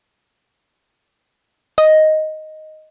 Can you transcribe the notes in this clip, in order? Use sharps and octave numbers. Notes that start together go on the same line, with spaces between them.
D#5